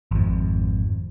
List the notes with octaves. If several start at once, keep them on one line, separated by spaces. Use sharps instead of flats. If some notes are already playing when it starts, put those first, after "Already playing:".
G#1 F2